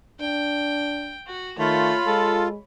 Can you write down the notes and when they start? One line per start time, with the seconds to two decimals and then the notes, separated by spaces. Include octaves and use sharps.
0.20 D4 G5
1.27 F#4
1.59 D#3 A3 F4 C#5 B5
2.07 G#3 A4